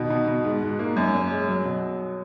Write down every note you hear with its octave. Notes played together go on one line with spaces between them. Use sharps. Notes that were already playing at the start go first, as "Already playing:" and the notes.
Already playing: B2 D#3
B2
B2
G#2
G#2
A#3
F#2
C#4
G#3
F#3
B2